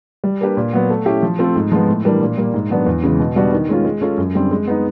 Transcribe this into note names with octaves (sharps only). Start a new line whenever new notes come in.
G3
A#3 D4 G4 B4
A#2
F#3 B3
A3
C#4 E4 G4
F3
A3 C4 F4 A4
G#2
F3 G#3 B3
A2
E3 G3 A#3 D4
A#2
G3 A#3
G#2
D#3 F#3 B3 D4
E2
C#3 E3 G#3
B2
G3 B3 D4 F#4
D#3
G#3 C#4 F4
G#3
C#4 F4 A4
F#2
D3 G3 C4
G#3
B3 D#4